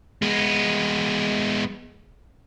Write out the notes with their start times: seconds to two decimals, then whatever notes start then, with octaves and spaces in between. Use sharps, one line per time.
0.22 G#3 B3